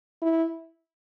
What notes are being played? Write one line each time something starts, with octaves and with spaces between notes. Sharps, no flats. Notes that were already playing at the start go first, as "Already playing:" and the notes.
E4